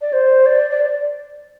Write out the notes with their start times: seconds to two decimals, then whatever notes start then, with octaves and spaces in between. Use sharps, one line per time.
0.01 D5
0.13 C5
0.46 D5
0.71 D5